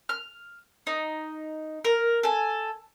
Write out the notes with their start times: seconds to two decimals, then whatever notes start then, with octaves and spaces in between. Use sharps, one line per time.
0.09 F6
0.87 D#4
1.85 A#4
2.23 A4 G#5